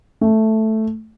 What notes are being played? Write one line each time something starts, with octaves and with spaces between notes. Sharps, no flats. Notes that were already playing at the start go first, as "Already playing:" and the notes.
A3